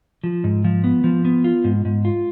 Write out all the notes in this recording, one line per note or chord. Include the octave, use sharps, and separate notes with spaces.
F3
G#2
F3
B3
F3
B3
F4
G#2
G#2
F4